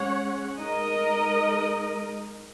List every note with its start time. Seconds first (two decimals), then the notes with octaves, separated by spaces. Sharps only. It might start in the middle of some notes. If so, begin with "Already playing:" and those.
Already playing: G#3 C#4 C#5 F#5
0.60 G#3 D#4 A#4 D#5